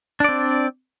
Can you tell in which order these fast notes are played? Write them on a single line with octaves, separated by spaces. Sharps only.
D4 D5 C4